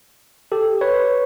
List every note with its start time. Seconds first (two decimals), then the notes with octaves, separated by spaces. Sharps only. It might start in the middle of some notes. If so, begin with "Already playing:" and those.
0.52 G4 A4
0.81 B4 C#5